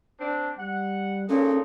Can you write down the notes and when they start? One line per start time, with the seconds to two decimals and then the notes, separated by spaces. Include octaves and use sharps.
0.21 C4 D4
0.58 G3 F#5
1.29 A#2 C#3 C#4 D#4 A4